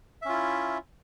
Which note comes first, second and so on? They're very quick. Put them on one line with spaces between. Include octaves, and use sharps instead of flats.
E5 C#4 F4 E4